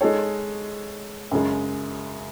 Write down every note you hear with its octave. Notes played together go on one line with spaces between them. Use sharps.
G#3 D#4 A4 C#5
F#2 C#3 G#3